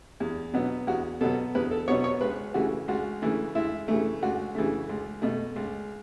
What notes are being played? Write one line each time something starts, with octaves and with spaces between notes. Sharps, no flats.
E2
B2 F#3 B3
E2 F#4
B2 F#3 B3 A4
E2 B4
A4
B2 F#3 B3 C#5
C#5
C#2 B4
C#3 E3 A3 F#4
C#2 F#4
C#3 E3 A3
C#2 E4
C#3 E3 A3
C#2 F#4
C#3 E3 A3
C#2
B2 A3
C#2